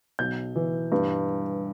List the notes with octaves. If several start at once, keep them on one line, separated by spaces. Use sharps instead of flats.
B1 G6
E3
G2